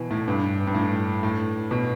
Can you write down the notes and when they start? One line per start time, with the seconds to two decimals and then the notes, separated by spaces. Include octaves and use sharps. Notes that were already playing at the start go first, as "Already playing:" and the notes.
Already playing: B2 E3
0.11 A2
0.28 G2
0.67 G2
0.75 A2
1.23 A2
1.71 B2